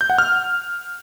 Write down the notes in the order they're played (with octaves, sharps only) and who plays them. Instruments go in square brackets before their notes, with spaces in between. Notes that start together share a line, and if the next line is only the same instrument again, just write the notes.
[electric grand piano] G6
F#5
F6